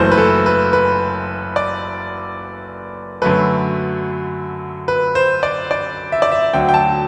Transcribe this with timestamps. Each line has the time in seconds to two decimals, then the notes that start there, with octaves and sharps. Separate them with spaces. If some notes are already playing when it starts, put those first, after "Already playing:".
Already playing: F#1 F#2 E3 A3 C5
0.12 B4
0.18 A4
0.46 B4
0.73 B4
1.56 D5
3.22 F#2 D3 F#3 A3 B4
4.88 B4
5.15 C5
5.43 D5
5.71 D5
6.12 E5
6.22 D5
6.32 E5
6.53 D2 D3 F#3 G5
6.69 G5
6.74 A5